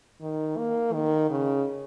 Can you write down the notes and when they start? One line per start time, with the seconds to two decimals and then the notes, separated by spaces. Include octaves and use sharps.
0.21 D#3
0.57 A#3
0.93 D#3
1.30 C#3